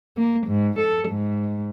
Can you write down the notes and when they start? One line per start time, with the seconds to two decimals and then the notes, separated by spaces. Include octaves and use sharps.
0.17 A#3
0.47 G#2
0.79 A4
1.09 G#2